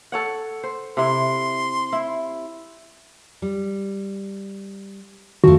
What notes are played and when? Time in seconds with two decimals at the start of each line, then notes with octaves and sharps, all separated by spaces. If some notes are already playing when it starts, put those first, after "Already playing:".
0.12 A4 C#5 F#5
0.64 C5
0.97 C3 E4 C6
1.93 E4
3.42 G3
5.44 F2 D#3 F3 A3 F#4